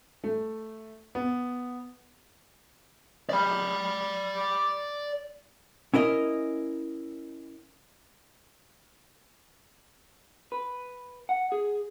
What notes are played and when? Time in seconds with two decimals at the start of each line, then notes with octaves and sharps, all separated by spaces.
0.24 A3
1.15 B3
3.29 D5 B5
5.94 C#4 E4 A#4 D#5
10.52 B4
11.29 F#5
11.52 G#4